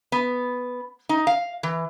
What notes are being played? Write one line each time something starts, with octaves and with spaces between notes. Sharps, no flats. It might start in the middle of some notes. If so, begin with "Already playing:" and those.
B3
D#4
F5
E3